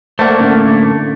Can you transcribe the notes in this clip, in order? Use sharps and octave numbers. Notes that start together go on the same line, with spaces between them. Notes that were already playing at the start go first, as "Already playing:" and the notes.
A3 A#3 C5 D5 F#5
A2 D3 C#4